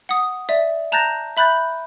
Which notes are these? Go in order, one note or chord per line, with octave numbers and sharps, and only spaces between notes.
F#5 D#6
D5 E5
A5 A#5 F#6 G6 A6 A#6
E5 B5 F#6 G6 A6